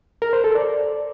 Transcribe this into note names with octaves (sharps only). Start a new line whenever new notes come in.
A#4
C5
A4
D5